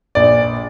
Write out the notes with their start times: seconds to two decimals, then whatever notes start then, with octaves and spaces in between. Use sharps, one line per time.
0.15 A#1 D5